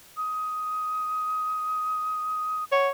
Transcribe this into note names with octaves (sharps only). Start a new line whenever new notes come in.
D#6
C#5 F#5